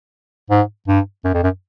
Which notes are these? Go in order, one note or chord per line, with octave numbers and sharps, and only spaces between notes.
G#2
G2
F#2
F2
F#2